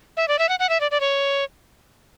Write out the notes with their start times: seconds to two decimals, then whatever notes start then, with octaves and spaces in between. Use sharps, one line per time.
0.17 E5
0.28 D5
0.39 E5
0.49 F#5
0.59 F#5
0.69 E5
0.80 D5
0.91 D5
1.00 C#5